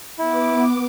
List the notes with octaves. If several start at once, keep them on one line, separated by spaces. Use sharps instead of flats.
B3 E4 D6